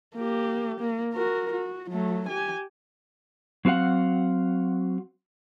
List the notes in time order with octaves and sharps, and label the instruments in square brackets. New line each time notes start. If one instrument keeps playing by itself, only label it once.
[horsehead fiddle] A#3 G4
A#3
F#4 A#4
F#4
F#3 A3
G4 G#5
[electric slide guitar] F#3 C4 F#4 F5 F#5